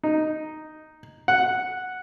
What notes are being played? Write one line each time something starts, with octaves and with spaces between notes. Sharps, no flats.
D#4
F#5